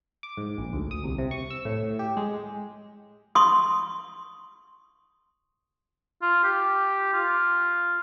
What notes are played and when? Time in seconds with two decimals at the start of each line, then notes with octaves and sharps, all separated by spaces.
0.23 D6
0.37 G#2
0.58 A#1
0.73 D2
0.91 D#6
1.04 C2
1.19 C3
1.31 C#6
1.50 E6
1.65 A2
1.99 G4
2.17 G#3
3.35 C6 C#6 D#6
6.22 F4
6.44 G4
7.13 F4